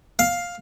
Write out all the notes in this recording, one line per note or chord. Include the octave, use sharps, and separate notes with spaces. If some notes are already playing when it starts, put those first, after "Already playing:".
F5